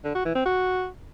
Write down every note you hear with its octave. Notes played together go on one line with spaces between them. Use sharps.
D3
F#4
E3
C4
F#4